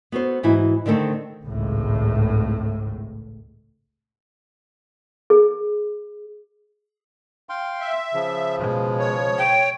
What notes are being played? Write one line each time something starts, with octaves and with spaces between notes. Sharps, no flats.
B3 F#4 A4 C5
G#2 E3 E4 F#4
D3 D#3 A3 C4 A4
G#1 C#2 A2
G#4
F5 G5 C6
E5
C#3 F3
B2 G#3
C#5
G5